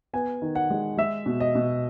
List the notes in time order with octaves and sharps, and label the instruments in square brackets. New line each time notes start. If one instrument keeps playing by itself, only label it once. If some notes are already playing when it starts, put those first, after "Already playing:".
[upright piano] B3 G#5
D#3
F#5
G#3
G#3 E5
B2
D#5
B2